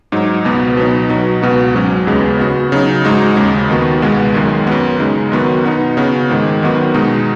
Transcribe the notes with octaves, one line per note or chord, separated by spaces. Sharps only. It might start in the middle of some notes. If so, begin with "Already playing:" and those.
G#2 F#3 D#4
C#2 B2 B3
B2 F#3 B3 D#4
B2 F#3 D#4 F#4
C#2 B2 B3 F#4
G#2 F#3 C#4
D#2 C#3 G#3 B3
C#3 B3 F#4
C#3 F#3 D#4
G#2 G#3 D#4 F#4
D#2 C#3 G#3
D#2 D#3 B3 F#4
C#2 B2 G#3 B3
F#2 D#3 G#3
F#2 F#3 B3
C#3 G#3 D#4
F#2 D#3 B3 F#4
B2 B3 D#4
C#3 B3 F#4
G#2 D#3 G#3
F#2 D#3 B3 F#4
B2 G#3 D#4